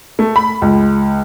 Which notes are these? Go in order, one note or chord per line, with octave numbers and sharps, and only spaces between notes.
A3
B5
C#2